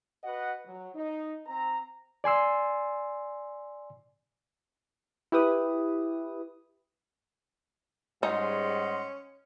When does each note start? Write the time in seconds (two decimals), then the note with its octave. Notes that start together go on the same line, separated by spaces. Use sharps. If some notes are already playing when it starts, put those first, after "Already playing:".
0.24 F#4 B4 D#5 F#5
0.65 F#3
0.95 D#4
1.47 C4 A#5
2.24 D5 G#5 C6 E6
5.32 E4 G4 B4 D#6
8.23 G#2 G3 C#4 D#4 D#5 F#5 C6